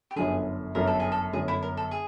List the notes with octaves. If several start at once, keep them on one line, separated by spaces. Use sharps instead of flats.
G4
G1 F#2 D3 G#4
G1 F#2 D3 A#4
A4
G#4
A4
G1 F#2 D3 G#4
E4
A#4
A4
G#4